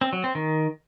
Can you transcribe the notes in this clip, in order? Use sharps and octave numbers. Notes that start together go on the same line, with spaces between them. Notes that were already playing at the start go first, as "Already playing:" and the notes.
C4
F#3
C4
D#3